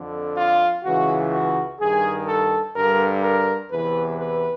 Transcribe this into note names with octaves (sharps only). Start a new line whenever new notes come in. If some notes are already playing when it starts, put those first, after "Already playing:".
Already playing: F2 D3
F4
C#2 C#3 E3 F#4
F#4
G2 D#3 G#4
A4
G2 D3 A#4
A#4
E2 C3 E3 B4
B4